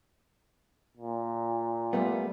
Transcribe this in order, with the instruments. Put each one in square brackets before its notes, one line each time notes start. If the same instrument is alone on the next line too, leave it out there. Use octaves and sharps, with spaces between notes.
[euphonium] A#2
[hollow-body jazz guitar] G3 A3 B3